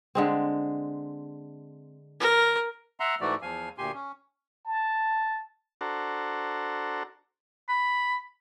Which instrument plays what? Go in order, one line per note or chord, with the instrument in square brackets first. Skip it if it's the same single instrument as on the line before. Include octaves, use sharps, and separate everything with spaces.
[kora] D3 G#3 C4
[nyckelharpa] A#4
[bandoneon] E5 F#5 A#5 C6
G#2 E3 A3 F#4 D5
E2 F3 F5 G#5
D2 A#2 G4 G#5 C6
C#4
[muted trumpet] A5
[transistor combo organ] D4 F#4 A4 C5 A#5
[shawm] B5